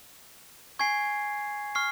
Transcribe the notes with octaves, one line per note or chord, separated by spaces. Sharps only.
G#5 C#6 G#6 C7
C#6 F6 C7